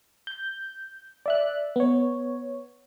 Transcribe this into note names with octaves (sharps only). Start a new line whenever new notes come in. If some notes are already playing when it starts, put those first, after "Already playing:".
G6
D5 E5 F#6
B3 C#5